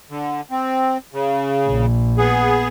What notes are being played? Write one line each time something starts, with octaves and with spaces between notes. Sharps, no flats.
D3
C4
C#3
A#1
B3 G#4